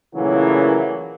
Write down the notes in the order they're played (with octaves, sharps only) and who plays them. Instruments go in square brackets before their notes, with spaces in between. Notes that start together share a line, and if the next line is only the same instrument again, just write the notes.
[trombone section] A#2 C#3 E3 F#3 A3 A#3